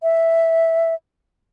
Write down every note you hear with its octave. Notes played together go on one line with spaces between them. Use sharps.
E5